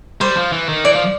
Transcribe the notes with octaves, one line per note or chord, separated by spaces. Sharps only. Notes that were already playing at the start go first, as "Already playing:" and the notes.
G3 C5
F3
E3
D#3
E3 D5
F3